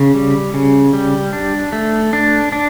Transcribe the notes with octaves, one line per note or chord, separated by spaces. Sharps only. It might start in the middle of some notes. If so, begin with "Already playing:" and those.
Already playing: C#3
G3
C#3
G3
D4
A3
D4
D4